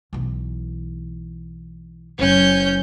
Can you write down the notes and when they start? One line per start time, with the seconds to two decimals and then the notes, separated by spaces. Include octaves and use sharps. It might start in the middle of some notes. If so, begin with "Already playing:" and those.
0.13 B1 E3
2.19 F#1 F#3 C#4 G6